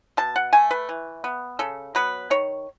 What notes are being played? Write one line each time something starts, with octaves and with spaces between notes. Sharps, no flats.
B2 A5
F#5
A3 G#5
B4
E3
B3
C#3 A4
F#3 B3 B4
D#3 C#5